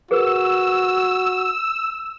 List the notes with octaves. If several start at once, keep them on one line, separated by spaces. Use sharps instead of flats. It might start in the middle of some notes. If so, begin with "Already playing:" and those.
F#4 G#4 A#4 B4 E6